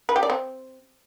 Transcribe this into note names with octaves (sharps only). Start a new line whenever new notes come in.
B4
G4
D5
C4